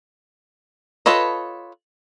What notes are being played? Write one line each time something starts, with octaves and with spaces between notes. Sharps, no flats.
F4 A4 B4 C#5 D#5